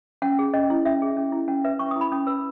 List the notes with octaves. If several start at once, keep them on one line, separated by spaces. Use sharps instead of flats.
C#4 F#5
G#4
C#4 D#5
E4
C#4 E5
G#4
C#4
E4
C#4 F#5
B4 E5
C#4 C#6
D#6
E4 B5
C#4 D#6
B4 E6